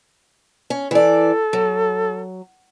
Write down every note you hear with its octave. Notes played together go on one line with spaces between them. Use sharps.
C#4
E3 A4 D5
F#3